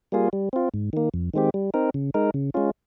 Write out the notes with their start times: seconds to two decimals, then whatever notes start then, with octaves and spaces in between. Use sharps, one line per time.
0.12 G3 A#3 F4 G#4
0.33 G3
0.53 C4 F4
0.74 G#2
0.93 D#3 A#3
1.14 F2
1.34 D#3 G#3 C4 G4
1.54 G3
1.74 C4 D#4 A#4
1.94 C#3
2.14 G#3 D#4 A#4
2.34 C#3
2.54 G#3 C#4 F4